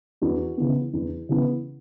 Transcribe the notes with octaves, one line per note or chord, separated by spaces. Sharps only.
E2 F#4
C#3 E3 B3
E2
C#3 E3 B3